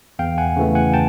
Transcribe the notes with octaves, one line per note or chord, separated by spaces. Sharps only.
E2 F5 G5
F#5 G#5
C#3 E3 A3
F#5 G#5
G5 A5